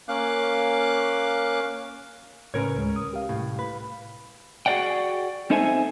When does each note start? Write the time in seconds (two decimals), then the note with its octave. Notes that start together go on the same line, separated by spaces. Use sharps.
0.08 A#3 C#4 F5 D6 F#6
2.54 A2 C#3 C#4 A#4 B4 C#5
2.75 D2 A2 G#3
2.96 D#6
3.13 G4 F5
3.29 C2 A2
3.59 B4
4.66 F#4 G#4 B4 D5 F#5 G5
5.50 C4 D#4 A4 C5 E5 G#5